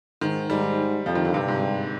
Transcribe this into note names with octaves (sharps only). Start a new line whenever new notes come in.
G#2 D#3
G#2 G3
F2 F3
D#3
D3
G2 C3
G#2